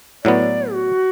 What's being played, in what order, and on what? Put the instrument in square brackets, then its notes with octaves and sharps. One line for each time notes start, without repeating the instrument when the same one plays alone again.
[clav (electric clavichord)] A2 F#3 B3 [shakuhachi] D5
[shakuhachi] F#4